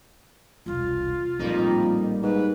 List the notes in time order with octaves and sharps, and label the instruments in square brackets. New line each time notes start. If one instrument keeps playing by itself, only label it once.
[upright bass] E1 C2 [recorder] F4
[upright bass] A1 A#2 [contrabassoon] F2 [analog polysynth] G3 A#3 D#4
[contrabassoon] G#2 [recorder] B4